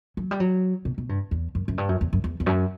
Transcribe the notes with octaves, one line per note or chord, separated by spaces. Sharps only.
F#3
G3
F#3
B2
B2
G2
E2
F#2
F#2
G2
F#2
E2
F#2
E2
E2
F#2